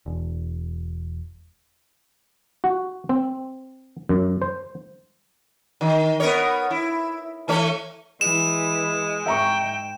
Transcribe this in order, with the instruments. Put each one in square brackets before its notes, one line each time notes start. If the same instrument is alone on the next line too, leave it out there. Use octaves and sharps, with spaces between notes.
[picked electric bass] E1
[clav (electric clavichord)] F#4
C4
F#2
C5
[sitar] D#3
B3 A#4 C#5
E4
E3 A3 C#5
[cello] E3 [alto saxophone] G#3 [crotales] E7
[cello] G#2 G5 [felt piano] E5 A#5 C#6